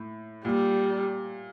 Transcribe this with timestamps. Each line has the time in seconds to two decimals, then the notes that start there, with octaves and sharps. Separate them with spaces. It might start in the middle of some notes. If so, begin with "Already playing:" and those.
Already playing: A2
0.45 A#2 G3